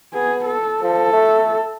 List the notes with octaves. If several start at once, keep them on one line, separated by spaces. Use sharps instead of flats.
B3 G#4
A4
F3 A4
A3